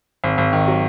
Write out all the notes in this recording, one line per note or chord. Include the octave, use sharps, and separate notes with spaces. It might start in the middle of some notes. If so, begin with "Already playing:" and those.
G#1
G#1
D#3
F#3